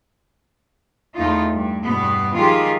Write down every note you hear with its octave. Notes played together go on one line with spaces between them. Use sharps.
E2 A3 D#4 F4
G2
E2 G2 B2 B3
D#3 F3 G#3 F4 G4 G#4